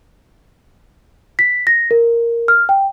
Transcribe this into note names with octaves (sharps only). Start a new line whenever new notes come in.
B6
A#6
A#4
F6
G5